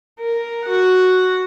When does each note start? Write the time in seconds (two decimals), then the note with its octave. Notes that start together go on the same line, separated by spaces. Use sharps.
0.20 A#4
0.66 F#4 F#5